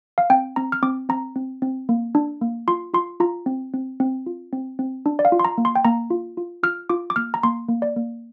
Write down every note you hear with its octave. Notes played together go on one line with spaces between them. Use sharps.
F5
C4 G5
C4 A#5
F6
C4 D6
C4 A#5
C4
C4
A#3
D4
A#3
F4 C6
F4 C6
F4 A#5
C4
C4
C4
F4
C4
C4
D4
D5
F5
F4
C6
A#5
A#3
C6
G5
A#3 A#5
F4
F4
F4 F6
F4 D6
D6
A#3 F6
A#5
A#3 C6
A#3
D5
A#3